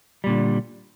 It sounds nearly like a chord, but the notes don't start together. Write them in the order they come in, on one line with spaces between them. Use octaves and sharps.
G3 A#2 D3